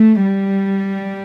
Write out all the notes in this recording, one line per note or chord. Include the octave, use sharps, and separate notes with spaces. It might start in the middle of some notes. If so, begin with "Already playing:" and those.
Already playing: A3
G3